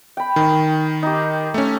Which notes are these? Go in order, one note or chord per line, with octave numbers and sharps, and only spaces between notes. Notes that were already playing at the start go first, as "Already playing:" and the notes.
G5 B5
D#3
D#4 G4
A3 C#4